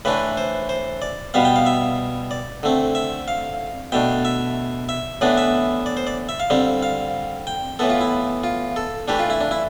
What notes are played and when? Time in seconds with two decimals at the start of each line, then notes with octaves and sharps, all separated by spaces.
0.05 A2 E3 A3 D4 B4
0.37 C5
0.69 C5
1.02 D5
1.34 B2 G3 B3 F5
1.45 G5
1.56 F5
1.66 E5
2.31 D5
2.63 D3 A3 C4
2.95 E5
3.28 F5
3.92 B2 A3 D4 G5
4.25 E5
4.89 E5
5.21 A2 E3 B3 D4 D5
5.37 E5
5.86 D5
5.97 C5
6.07 D5
6.29 E5
6.40 F5
6.50 D3 G3 C4
6.83 F5
7.47 G5
7.79 A2 E3 B3 A4
7.90 F4
8.01 E4
8.44 F4
8.76 A4
9.08 E3 A3 D4 G4
9.19 F4
9.30 E4
9.41 D4
9.51 E4